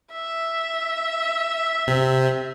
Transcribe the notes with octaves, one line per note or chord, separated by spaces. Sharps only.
E5
C3